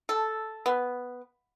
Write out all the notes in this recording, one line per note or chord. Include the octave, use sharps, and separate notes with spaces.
A4
B3